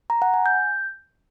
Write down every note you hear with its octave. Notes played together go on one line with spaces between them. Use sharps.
A#5
F#5
G#5
G6